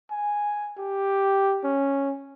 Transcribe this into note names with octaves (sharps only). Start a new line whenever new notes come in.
G#5
G4
C#4